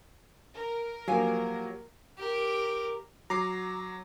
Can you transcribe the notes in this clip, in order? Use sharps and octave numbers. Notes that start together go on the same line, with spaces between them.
A#4
F3 F#3 A#3 G4 F5 G#5
G4 A#4
F#3 A#5 D6 C7